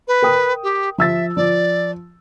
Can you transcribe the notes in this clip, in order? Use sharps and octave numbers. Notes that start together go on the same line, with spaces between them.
B4
A#4 G5 D#6
G4
F3 E5 E6 A6
F3 D5